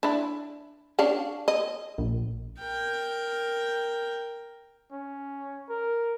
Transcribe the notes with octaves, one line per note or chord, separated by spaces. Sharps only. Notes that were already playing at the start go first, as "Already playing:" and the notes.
D4 E4
C#4 D4 F5
D#5
A#1
A#4 G5
C#4
A#4